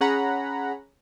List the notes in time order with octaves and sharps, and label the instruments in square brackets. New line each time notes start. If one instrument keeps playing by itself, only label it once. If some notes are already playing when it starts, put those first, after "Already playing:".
[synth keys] C#4 G#4 F#5 A#5 B5